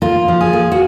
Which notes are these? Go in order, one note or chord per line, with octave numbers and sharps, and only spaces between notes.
A#3 F4
F3
G#4
A#3
F#4